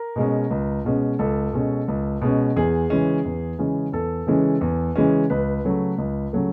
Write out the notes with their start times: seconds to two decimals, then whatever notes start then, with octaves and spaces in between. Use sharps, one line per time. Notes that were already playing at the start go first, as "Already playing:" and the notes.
Already playing: A#4
0.16 B2 G#3 C#4
0.51 C#2
0.85 B2 G#3 C#4
1.19 C#2 A4
1.53 B2 G#3 C#4
1.88 C#2
2.21 B2 G#3 C#4
2.56 E2 G#4
2.90 C#3 E3 G#3 C#4
3.25 E2
3.59 C#3 E3 G#3 C#4
3.92 E2 A4
4.27 C#3 E3 G#3 C#4
4.61 E2
4.96 C#3 E3 G#3 C#4
5.30 C#2 B4
5.65 C#3 F#3 A3
5.98 C#2
6.33 C#3 F#3 A3